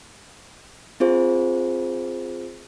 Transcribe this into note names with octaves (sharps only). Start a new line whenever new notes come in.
C4 F4 G#4 C5